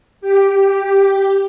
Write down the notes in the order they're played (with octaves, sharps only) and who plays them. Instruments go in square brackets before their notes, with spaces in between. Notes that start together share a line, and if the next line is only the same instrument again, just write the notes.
[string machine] G4